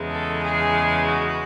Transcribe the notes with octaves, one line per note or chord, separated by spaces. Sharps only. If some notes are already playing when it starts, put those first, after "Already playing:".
Already playing: E2 C#3 G#3
A4
G#4
F#4